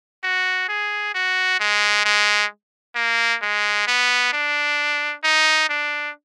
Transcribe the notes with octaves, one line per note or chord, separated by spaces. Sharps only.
F#4
G#4
F#4
G#3
G#3
A#3
G#3
B3
D4
D#4
D4